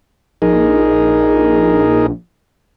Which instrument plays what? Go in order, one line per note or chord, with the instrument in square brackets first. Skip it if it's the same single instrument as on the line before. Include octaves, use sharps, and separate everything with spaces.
[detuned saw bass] A#1 [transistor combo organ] D#4 G#4 A#4